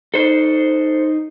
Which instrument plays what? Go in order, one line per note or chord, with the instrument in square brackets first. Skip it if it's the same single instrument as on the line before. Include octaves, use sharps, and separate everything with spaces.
[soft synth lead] D#4 [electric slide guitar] A4 C5